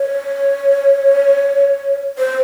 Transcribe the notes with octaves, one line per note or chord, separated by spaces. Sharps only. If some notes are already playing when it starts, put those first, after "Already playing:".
Already playing: C#5
C5